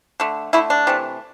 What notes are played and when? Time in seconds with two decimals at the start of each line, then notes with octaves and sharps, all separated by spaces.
0.20 D3 A3
0.53 D3 A3 E4
0.70 D4
0.87 C3 E3 A3